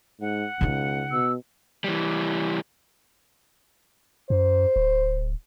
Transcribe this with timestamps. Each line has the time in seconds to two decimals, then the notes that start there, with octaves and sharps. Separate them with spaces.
0.21 G#2 F#5
0.61 C#2 C#3 D#4
1.12 B2 E6
1.84 E3 G3
4.30 F#2 C5
4.76 D1